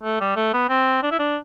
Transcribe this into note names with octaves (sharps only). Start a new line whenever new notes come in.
A3
G3
A3
B3
C4
D4
E4
D4